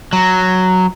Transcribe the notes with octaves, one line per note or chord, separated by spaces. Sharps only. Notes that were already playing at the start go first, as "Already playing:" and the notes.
F#3